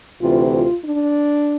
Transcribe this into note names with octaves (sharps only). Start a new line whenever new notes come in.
D2 C3 E3 F4
F4
D4